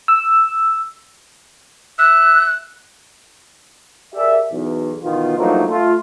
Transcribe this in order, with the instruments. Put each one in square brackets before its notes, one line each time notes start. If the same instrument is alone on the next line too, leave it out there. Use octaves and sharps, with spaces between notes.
[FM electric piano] E6
[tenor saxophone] E5 [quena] F#6
[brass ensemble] G4 G#4 A#4 D5 E5
B1 E2
B2 D#3 E3 B3 F4
G2 F3 F#3 A3 A#3 D#4
A3 F4